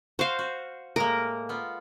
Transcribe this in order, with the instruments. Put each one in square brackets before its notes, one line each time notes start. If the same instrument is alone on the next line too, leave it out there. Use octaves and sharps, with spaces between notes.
[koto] F#4 [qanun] C5 F5
[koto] F#4
[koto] A2 G#3 A#3 [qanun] A#4
[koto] B3 F4